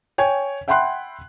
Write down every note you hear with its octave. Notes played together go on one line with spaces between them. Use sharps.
C#5 G5 G#5 G#6
E5 F#5 G5 B5 C6 F#6